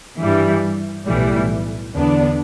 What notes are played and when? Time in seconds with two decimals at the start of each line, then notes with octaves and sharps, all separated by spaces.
0.20 G2 E3 G3
1.07 B1 A2 E3 G3
1.95 E2 D3 B3 D4